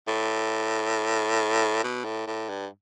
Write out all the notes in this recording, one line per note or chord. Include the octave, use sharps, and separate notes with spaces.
A2
B2
A2
A2
G2